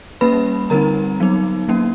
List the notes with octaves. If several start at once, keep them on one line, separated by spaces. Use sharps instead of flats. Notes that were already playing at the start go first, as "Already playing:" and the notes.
G3 A#3 C#4 B4 B5
D3 G3 C4 D#4 A#4 A#5
F#3 B3 D#4
F#3 A#3 C#4